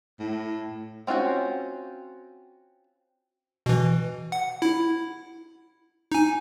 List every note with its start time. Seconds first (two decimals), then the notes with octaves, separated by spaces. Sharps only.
0.19 A2
1.07 C4 C#4 F4 F#4 G5
3.66 B2 E3
4.32 F#5
4.62 E4
6.12 D#4 G#5